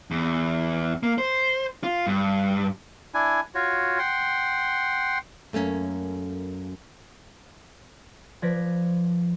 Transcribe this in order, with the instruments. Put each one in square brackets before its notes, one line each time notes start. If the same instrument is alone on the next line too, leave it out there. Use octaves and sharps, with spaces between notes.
[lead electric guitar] E2
A#3
C5
F4
G2
[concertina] D4 E4 G#5
F4 F#4 C#5
F#5 G5 C6
[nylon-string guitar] F#2 A3 A#3 C#4
[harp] F3 B4 D5 G#6 A#6 B6